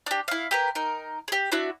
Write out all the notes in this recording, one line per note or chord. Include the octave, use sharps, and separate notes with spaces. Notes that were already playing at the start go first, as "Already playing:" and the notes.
D4 G4
E4 F5
G4 A#4 B4
D#4 A#4
G4 G#4
D4 E4 F#4 E5